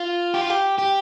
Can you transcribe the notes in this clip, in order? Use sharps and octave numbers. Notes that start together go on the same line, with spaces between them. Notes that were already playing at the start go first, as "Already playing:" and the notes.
Already playing: F4
G4
F4
G4
G4